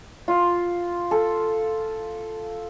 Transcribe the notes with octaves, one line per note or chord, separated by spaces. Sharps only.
F4
A4